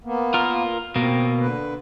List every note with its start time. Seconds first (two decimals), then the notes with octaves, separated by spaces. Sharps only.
0.04 A#3 B3
0.34 F4 A#4
0.96 B2 A#3 C4
1.40 D3 B4